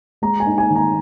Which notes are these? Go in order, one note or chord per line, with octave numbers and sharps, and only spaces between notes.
G#3 A#5
G#5
D#4
G#5
D#3
A#5